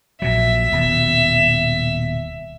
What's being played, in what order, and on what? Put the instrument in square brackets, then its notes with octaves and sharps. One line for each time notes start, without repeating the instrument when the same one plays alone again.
[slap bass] A#1 A#2 F#3 [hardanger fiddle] E5
[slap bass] D#1 B2